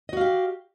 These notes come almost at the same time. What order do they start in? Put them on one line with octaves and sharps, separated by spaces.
D#5 F#4 F5 G4